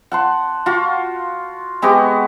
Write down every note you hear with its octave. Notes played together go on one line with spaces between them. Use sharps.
F#5 A5 C6
F4 F#4
G#3 B3 F#4 G4